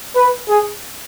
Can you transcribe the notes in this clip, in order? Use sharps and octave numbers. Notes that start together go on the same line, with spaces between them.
B4
G#4